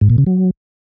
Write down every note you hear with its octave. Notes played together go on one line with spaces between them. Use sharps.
G#2
A#2
C#3
F#3